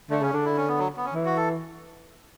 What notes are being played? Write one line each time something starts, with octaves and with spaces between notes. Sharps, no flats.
D3 A3
C#3 C#4
D3 D4
E4
C#4
B3
F#3
B3
C#4
E3
F#4
A4